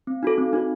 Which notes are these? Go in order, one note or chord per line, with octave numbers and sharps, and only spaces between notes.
C4
D#4 F#4 A4
C4
D#4 F#4 A4